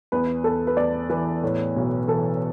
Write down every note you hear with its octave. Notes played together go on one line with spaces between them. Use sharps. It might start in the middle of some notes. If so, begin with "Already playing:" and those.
E2 B4
E2 A4
B4
E2 D5
E3 B4
A2
B1
E3 A4